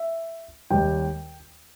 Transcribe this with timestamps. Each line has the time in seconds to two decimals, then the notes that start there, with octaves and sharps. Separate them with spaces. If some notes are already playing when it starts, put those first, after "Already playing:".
Already playing: E5
0.70 D#2 D#3 G3 G5